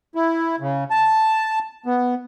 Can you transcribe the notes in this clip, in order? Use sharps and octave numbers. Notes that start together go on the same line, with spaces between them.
E4
C#3
A5
B3